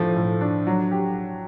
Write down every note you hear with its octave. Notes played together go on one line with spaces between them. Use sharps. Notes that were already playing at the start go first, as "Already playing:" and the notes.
Already playing: A2 F3 A3 D4
A2
D4
F#3
G4